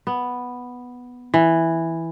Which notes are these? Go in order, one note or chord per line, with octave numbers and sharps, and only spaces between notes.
B3
E3